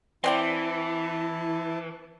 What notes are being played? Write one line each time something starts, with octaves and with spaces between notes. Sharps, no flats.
E3 C4 E4 D5 G5 A5